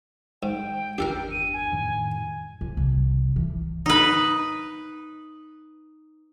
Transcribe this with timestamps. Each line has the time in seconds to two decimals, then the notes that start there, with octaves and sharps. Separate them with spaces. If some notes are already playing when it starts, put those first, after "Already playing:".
0.43 G#2 G5
0.98 G1 E2 D4 G4 A4 A#4
1.32 D#7
1.53 G#5
1.72 F2 A2 D#3
2.61 F2
2.77 C2
3.36 E3
3.86 D#4 B4